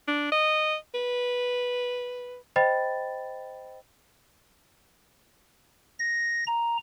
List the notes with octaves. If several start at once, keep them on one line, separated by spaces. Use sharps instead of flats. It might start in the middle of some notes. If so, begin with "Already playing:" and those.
D4
D#5
B4
C5 D#5 G5 B5 A6
A#6
A#5